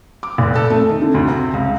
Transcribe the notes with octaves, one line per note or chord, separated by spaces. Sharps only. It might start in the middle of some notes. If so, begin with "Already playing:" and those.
D6
F1
A4
A3
D#3
D3
D2
C3
C#2